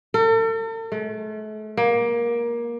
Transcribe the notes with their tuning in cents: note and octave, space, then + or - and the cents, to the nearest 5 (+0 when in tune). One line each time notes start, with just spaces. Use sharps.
A4 +45
A3 -40
A#3 +20